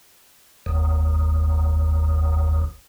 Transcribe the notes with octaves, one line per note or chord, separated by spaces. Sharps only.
F#1 D#2